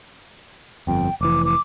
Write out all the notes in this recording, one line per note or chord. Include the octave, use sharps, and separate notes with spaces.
G1 F2 G5
F1 E3 D6
D6